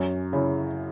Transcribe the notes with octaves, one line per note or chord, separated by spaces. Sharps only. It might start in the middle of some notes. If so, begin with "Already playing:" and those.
Already playing: F#2 C#4
C#3 E4